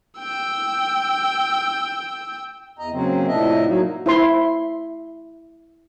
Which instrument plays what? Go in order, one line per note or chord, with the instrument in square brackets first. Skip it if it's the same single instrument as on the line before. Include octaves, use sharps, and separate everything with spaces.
[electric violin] G5 E6
[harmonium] E2 D#5 A#5
C#3 F#3 A#3 C4
A2 C3 F3 D4 D#5 E5
F#3 A#3 D#4
[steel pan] E4 C5 C6